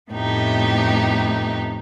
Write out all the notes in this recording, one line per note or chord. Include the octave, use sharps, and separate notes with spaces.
F2 A2 A3 B3 D#4 G4